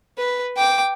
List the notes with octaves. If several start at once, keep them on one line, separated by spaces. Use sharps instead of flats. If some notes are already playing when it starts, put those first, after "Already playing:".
B4
G5 D6